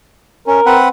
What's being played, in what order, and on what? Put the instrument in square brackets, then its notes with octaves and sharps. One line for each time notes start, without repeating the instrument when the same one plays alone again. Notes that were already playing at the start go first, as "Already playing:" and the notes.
[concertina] C#4 [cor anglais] A#4
[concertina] C4 B4 F#5